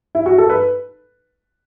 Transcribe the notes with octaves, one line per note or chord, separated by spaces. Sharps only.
E4
F#4
A4
B4